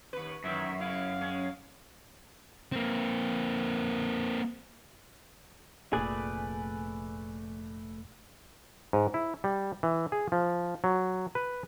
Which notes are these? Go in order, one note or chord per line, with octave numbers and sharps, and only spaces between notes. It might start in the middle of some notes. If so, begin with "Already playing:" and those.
D#2 B4
F#2 D#3 E3 E5
C#3 E4 F5
G#3 C#4
A#3 C4
F1 A#2 A3 G#4 B4 D5
G#2
E4
G3
E3
G#4
F3
F#3
B4